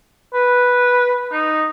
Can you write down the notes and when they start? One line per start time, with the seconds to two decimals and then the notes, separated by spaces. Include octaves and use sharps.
0.34 B4
1.32 D#4